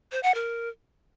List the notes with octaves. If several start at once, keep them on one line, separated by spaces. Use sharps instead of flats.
C5
F#5
A#4